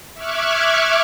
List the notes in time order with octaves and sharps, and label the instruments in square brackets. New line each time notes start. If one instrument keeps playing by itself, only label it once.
[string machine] E5 C#6 D6 F6 F#6 G#6